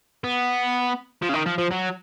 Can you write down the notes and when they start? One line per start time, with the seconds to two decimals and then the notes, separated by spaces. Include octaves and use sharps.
0.24 B3
1.22 F3
1.29 C#3
1.34 D#3
1.46 F3
1.58 F3
1.71 F#3